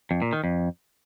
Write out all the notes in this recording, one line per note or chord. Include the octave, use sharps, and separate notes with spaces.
F2
A#2
D#3
F2